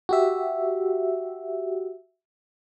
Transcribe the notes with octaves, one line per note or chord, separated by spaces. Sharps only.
F#4 G4 E5